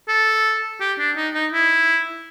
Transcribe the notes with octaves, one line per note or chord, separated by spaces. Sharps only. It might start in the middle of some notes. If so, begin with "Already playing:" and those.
A4
G4
D4
D#4
D#4
E4